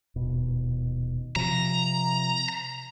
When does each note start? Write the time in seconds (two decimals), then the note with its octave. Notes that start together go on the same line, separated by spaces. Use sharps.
0.16 D#1 B2
1.36 C3 F3 A#5